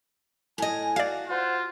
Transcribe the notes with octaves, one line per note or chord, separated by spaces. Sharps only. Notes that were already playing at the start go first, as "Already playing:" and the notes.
A2 D#5 G#5
F#4 D5 F5
F4 C5 F#5